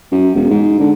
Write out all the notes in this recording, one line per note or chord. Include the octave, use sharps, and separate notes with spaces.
F#2
E1
G#2
D3